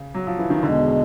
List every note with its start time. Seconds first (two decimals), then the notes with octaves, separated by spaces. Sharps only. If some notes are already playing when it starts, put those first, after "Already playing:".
Already playing: C#3
0.14 F#3
0.27 F3
0.39 E3
0.50 D#3
0.62 E2 B2 D3 G#3